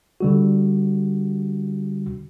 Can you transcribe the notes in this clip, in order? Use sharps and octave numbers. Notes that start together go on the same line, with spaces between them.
D3 G3 F#4